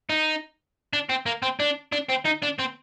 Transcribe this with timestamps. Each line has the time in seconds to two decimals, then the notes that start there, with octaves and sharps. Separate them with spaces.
0.10 D#4
0.93 D4
1.10 C4
1.26 A#3
1.43 C4
1.60 D4
1.93 D4
2.10 C4
2.25 D#4
2.43 D4
2.59 C4